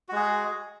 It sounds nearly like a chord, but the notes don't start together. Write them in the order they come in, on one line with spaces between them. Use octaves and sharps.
F#4 G#3 G#4